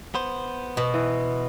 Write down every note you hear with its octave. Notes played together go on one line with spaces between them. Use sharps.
B3 C5
B2
E3